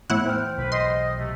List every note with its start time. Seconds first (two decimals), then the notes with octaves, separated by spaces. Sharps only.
0.10 A2 E3 B3 E4 F#5
0.26 C5 G5 F6
0.58 B1 E3 B4
0.72 D#5 C6
1.18 C3 A3